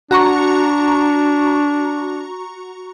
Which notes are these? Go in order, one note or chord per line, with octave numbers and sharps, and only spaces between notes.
D4 F#4 A#5 C#6